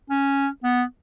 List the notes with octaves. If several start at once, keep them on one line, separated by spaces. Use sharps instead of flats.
C#4
B3